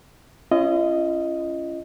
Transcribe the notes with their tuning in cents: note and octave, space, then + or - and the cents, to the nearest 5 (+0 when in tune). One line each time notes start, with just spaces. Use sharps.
C#4 +0 F4 -45 D#5 +0